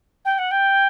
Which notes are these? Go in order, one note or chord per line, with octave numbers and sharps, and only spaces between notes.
G5
F#5
G5